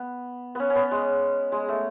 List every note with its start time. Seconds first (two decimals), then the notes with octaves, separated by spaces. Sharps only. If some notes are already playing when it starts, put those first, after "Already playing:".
Already playing: B3
0.55 B3 C#4
0.70 C#4
0.75 B3
0.91 G#3
1.52 G#3
1.69 A3